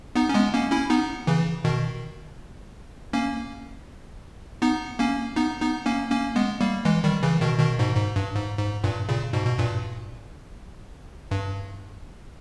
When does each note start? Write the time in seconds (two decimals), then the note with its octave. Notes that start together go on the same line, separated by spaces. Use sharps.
0.16 B3 D#4
0.29 C#4
0.34 G#3 B3
0.53 A#3 C#4
0.72 C#4 E4
0.90 B3 D#4
1.27 C#3 E3
1.65 B2 D#3
3.13 A#3 C#4
4.62 B3 D#4
4.99 A#3 C#4
5.36 B3 D#4
5.61 B3 D#4
5.86 A#3 C#4
6.11 A#3 C#4
6.36 G#3 B3
6.61 G3 A#3
6.85 E3 G#3
7.04 D#3 G3
7.23 C#3 E3
7.42 B2 D#3
7.59 B2 D#3
7.79 G#2 B2
7.97 G#2
8.16 G2
8.35 G#2
8.59 G#2
8.84 G2 A#2
9.09 A#2 C#3
9.33 G#2 B2
9.47 B2
9.59 G2 A#2
11.31 G2